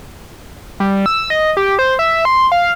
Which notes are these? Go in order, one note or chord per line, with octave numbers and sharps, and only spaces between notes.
G3
E6
D#5
G4
C5
E5
C6
F5